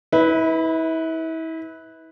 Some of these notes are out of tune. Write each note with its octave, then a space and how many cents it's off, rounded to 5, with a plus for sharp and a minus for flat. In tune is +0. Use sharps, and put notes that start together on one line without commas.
E4 -35 B4 +0